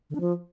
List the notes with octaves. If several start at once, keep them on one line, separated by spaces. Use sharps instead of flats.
D3
D4
F3